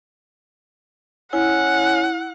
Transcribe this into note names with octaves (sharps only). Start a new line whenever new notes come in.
C#4 E4 F#5